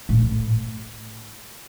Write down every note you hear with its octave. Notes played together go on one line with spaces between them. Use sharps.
A2